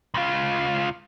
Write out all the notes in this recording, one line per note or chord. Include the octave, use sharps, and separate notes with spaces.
C#2 F4